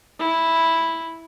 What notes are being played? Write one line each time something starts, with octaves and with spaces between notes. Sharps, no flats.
E4